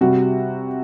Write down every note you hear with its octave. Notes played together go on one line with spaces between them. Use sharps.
C3 G3 F#4